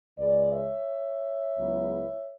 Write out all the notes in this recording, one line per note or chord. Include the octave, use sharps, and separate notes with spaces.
C#2 C#3 G#3 B4 D5
C#5 E5
C#2 C#3 F#3 B3 E4